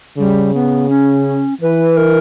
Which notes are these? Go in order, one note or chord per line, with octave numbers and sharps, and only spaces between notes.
C#3 G3
B3
C#4
E3 B4
A#4